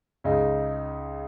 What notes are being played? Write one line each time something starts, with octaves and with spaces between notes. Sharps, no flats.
C#2 C#3 G#3 D#4